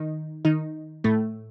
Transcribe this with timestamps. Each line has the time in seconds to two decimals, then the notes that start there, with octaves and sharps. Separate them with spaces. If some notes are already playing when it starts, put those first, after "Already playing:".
Already playing: D#3 D#4
0.45 D#3 D#4
1.04 A2 A3